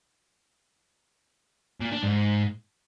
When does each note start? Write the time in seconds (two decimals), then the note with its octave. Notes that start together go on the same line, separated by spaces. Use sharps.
1.81 A#2
1.92 D4
2.03 G#2